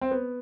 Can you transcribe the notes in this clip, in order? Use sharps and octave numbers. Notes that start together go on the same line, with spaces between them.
C4
B3